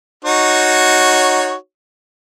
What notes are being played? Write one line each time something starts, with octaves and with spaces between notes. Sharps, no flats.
D#4 F#4 C#5